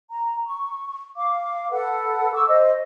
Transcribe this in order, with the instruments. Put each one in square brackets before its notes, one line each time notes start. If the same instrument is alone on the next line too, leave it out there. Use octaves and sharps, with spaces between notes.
[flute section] A#5
C#6
F5 D6
A4 B4 F#5
C#6 D6 E6
C5 D#5